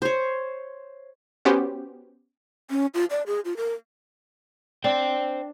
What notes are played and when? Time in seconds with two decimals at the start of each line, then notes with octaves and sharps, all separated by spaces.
0.02 C5 C#5
1.45 B3 C#4 F#4 G4 C5
2.70 C#4
2.94 F4
3.10 D5
3.26 G#4
3.45 F4
3.57 A#4
4.84 D4 C5 G5